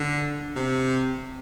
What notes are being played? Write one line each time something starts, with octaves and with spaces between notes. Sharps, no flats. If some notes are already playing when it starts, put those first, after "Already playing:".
Already playing: D3
C3